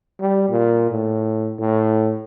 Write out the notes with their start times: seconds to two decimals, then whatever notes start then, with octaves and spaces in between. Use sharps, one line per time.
0.20 G3
0.50 A#2
0.91 A2
1.59 A2